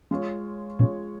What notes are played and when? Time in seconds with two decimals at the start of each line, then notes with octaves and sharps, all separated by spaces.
0.11 G#3 F4 C#5
0.79 A#2 G#3 F4 C#5